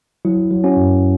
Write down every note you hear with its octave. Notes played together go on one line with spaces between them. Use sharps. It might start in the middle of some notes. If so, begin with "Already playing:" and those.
F#3 E4
F#3
C#4 F#4
F#2